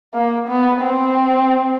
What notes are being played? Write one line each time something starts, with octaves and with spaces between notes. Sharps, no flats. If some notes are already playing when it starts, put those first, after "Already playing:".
A#3
B3
C4